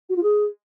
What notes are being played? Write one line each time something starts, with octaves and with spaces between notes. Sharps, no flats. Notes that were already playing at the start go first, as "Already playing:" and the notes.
F#4
F4
G#4